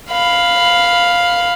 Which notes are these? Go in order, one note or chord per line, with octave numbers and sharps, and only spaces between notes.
F5 B5